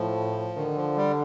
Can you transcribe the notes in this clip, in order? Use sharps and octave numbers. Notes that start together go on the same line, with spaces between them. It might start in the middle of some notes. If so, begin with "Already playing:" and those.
Already playing: A2 F3
D3 D#3
F3
G3